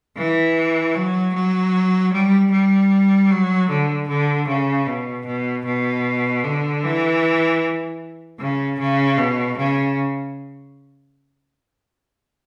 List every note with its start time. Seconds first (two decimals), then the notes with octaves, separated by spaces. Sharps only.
0.17 E3
0.95 F#3
1.34 F#3
2.13 G3
2.52 G3
3.31 F#3
3.69 D3
4.08 D3
4.48 C#3
4.87 B2
5.26 B2
5.65 B2
6.44 D3
6.83 E3
8.40 C#3
8.79 C#3
9.18 B2
9.57 C#3